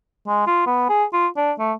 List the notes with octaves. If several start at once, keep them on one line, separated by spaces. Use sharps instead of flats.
G#3
F4
B3
G#4
F4
D4
A3